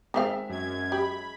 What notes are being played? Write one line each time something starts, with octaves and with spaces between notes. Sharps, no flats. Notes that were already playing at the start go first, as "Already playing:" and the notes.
D#3 G#3 C4 E5 F5
F#2 G#6
G4 B5